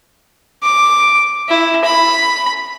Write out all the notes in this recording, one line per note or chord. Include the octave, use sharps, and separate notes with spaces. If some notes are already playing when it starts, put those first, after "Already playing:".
D6
E4
B5